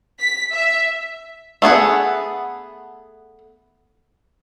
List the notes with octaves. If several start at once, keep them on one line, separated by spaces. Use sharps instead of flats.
B6
E5
A3 B3 G#4 F#5